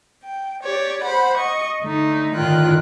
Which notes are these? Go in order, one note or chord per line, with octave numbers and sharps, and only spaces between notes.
G5
G4 C#5 D5
C5 F#5 B5
D#5 C#6
D3 A3 D#4
A2 D3 D#3 F4 G5 F#6